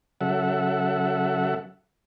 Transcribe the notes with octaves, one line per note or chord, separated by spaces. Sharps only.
C#3 F#3 A4 E5 F#5